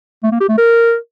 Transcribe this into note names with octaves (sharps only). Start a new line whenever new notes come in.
A3
A#3
G4
A3
A#4